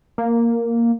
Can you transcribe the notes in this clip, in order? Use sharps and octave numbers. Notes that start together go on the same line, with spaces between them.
A#3